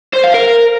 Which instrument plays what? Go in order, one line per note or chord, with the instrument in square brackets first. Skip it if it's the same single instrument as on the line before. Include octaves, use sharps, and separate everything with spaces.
[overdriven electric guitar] C5
F5
A#4